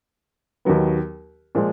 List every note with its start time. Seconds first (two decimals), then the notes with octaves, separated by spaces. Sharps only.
0.65 D#2 D#3 F#3 B3
1.55 A#2 F3 G#3